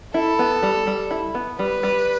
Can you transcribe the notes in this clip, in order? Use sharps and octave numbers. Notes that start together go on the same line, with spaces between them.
E4 A4
B3
G3
G3
E4
B3
G3 B4
G3